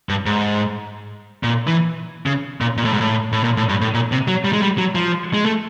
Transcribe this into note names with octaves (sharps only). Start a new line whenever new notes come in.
G2
G#2
A#2
E3
C#3
A#2
A#2
A2
G#2
A2
A2
A#2
A2
G2
A2
A#2
C3
F#3
G3
G#3
G3
F#3
F3
G#3
A3